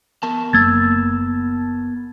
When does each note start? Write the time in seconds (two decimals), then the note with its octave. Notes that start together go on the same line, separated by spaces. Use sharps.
0.23 B3 A#4 A5
0.53 F#1 A#3 E6 G#6 A6